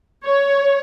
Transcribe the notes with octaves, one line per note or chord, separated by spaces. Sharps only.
C#5